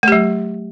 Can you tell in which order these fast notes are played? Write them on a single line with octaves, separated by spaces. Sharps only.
A3 G4 F#3